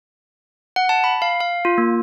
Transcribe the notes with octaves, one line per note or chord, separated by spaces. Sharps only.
F#5
A5
B5
F5
F5
F4
A#3